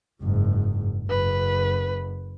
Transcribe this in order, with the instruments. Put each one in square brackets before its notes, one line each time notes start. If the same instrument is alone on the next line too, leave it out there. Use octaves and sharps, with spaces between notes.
[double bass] F#1 G#2
[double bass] F#1 [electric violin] B4